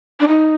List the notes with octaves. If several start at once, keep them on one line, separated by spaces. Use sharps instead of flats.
D4
D#4